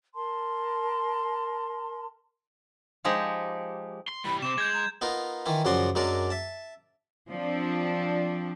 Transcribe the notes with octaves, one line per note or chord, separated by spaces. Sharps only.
A#4 A5 C6
F3 G#3 D#4 G4 G#4
C6
E3 G3 B5
C3 C4 D6 E7
G#3 G6 G#6
A#5
B3 D#4 F4 A#4
D#3 E3 E4 F4
F#2 C#3 F3 F#4 D5 C6
F#2 F#3 G#3 D4 A#4 D5
E5 A5
F3 C4 D4